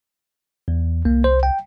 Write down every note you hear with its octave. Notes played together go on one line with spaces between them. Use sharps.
E2
C2 A#3
C5
G5